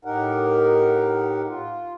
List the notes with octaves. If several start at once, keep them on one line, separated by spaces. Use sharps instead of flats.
A2 D#4 G4 A#4 F#5
F4